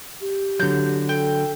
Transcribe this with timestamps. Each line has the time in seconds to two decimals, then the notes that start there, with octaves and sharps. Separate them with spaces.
0.21 G4
0.60 D3 F#3 G6
1.09 A4 G5